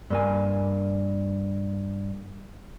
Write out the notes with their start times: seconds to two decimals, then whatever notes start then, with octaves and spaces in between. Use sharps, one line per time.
0.10 G2 A#3 G#5